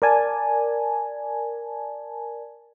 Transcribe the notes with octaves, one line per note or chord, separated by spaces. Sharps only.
A#4 D5 G#5 A5